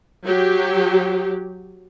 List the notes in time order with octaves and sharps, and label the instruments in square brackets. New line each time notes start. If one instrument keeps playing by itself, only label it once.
[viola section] F#3 G4